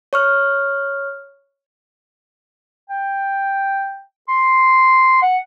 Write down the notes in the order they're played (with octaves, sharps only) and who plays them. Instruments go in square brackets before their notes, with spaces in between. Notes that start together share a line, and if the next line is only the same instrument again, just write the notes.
[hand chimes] C#5 C#6 F6
[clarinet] G5
C6
F#5